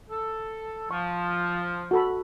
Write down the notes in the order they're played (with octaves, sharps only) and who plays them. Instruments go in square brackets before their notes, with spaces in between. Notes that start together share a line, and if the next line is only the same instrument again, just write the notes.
[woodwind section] A4
[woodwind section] F3 [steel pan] C#6
[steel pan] F#4 A4 B5